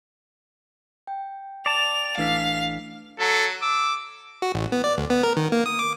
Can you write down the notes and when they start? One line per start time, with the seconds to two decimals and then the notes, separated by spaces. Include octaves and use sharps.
1.07 G5
1.66 D5 A5 F7
2.18 A1 E3 A3 D4 F5 B6
3.19 F#3 A4
3.62 D6 E6
4.42 F#4
4.54 A1
4.72 B3
4.84 D5
4.98 D2
5.10 B3
5.23 A#4
5.37 D#3
5.52 A#3
5.66 D#6
5.79 D6